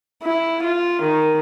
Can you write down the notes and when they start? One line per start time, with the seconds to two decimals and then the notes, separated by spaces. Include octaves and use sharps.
0.23 E4
0.64 F4
1.03 D#3